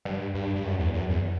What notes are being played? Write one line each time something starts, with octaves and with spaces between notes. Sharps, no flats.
G2
G2
G2
F#2
E2
F#2
E2